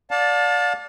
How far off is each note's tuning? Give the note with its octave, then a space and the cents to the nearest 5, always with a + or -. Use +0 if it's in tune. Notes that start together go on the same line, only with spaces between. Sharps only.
D5 -10 F5 +40 A5 +0